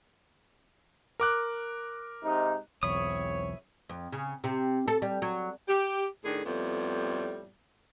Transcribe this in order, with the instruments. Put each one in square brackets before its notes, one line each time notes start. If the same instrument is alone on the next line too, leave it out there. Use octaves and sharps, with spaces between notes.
[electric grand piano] A#4 D6 F#6
[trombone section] G#2 C3 D#4
[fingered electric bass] B1 E2 [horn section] G#2 C4 C#5 [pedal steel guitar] E5 B5 D#6
[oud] F2
C#3
C3
A4
G3
F#3
[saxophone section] G4
A2 D#3 D4 G#4
F2 A2 G3 B3